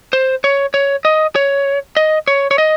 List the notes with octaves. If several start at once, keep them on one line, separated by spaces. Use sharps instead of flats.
C5
C#5
C#5
D#5
C#5
D#5
C#5
C#5
D#5